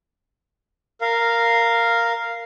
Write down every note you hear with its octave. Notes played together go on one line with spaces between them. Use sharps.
A#4 F5